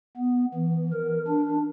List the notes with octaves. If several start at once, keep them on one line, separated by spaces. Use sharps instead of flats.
B3
E3
A#4
D4